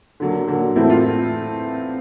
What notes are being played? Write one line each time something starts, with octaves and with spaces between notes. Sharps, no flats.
D3 F#3 A#3
D3 F#3 A#3
A2 E3 A3 C4 E4
F4